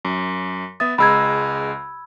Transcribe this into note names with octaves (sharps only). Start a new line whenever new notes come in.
F#2
B3 E5 D#6 A6
C#2 G#3 A#5 B5 E6 G#6